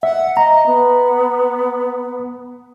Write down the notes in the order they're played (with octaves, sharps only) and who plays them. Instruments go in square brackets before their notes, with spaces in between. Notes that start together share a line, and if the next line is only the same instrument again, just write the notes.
[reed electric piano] E5 [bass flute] F#5
[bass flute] D#5 [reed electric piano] A#5
[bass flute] B3